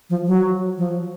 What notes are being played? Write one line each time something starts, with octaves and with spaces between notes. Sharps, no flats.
F3
F#3
F3